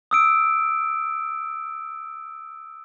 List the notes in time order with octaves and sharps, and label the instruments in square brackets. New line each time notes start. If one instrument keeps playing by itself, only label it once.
[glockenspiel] D#6 E6 D7